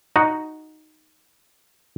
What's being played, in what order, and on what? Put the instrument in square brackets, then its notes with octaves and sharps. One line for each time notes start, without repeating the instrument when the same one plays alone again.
[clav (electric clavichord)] D#4 F#4